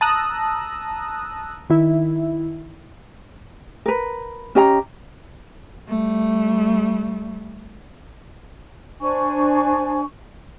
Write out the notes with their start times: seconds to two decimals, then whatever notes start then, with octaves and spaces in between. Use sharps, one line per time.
0.01 A5 A#5 D#6 E6 F#6 A#6
1.70 D#3 E4
3.86 A#4 B4
4.55 C#4 G4 D#5 A#5
5.88 G3 A3
9.00 D4 C5 G#5 C#6